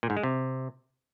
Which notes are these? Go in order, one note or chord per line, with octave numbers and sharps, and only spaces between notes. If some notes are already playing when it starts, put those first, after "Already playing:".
A#2
G#2
G#3
C3